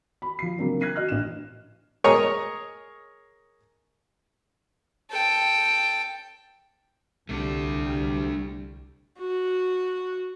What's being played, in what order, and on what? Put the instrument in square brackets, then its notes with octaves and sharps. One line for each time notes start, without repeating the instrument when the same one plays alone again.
[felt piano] B5
F3 C7
C#3 F#3 A#3 C4 D4
F#6 G#6 A#6 C7 D#7
F#4 D#5 F6 F#6
A1 D4 E7
[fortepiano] G#4 A#4 C#5 D#5 C#6
[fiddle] A4 G5
[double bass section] C2 D3 G3 [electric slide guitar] A3 D4 A4
[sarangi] F#4